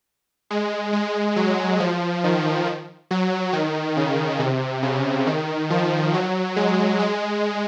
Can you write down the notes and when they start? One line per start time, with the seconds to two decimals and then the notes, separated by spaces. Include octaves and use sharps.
0.51 G#3
0.93 G#3
1.36 F#3
1.80 F3
2.24 D#3
3.11 F#3
3.53 D#3
3.97 C#3
4.39 C3
4.83 C#3
5.27 D#3
5.70 F3
6.14 F#3
6.56 G#3
6.99 G#3